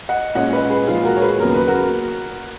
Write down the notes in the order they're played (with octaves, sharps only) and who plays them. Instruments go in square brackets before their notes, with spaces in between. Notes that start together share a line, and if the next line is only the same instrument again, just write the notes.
[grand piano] D#5 F#5
A#2 G#3 C#4 D#5 F#5
B4 D#5
G#4 B4
A#2 F3 G#3 F4 G#4
F#4 A#4
C#5
G#4 B4
D#2 C#3 F#3 B3 A#4
B4
F#4 A#4